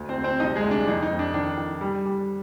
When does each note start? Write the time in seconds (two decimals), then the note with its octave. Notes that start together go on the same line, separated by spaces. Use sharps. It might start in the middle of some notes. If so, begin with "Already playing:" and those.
Already playing: D2
0.09 C4 C5
0.17 D2
0.24 C4 C5
0.40 C2 D#4 D#5
0.56 G#3 G#4
0.64 C2
0.71 D4
0.88 F2 D#4
1.02 D#4
1.11 F2
1.19 D4
1.34 D#3 D4
1.58 D#3
1.81 G3
2.05 G3